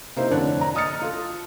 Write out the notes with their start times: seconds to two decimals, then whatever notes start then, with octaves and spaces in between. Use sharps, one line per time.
0.16 C3 A#3 D#4 E4 C5
0.31 F1 D3 D4 C#5 F#6
0.61 A#5
0.75 D#5 D#6 F6 A6 C#7
1.02 F4 A4